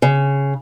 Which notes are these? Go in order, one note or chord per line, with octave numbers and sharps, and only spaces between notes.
C#3